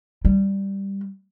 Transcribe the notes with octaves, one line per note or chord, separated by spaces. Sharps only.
G3